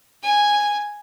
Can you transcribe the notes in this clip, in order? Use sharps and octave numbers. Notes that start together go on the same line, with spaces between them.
G#5